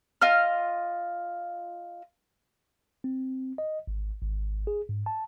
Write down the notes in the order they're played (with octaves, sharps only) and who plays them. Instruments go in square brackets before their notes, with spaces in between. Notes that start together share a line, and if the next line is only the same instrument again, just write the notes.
[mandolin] F4 D#5 F6
[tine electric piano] C4
D#5
G#1
G#1
G#4
G#2
A5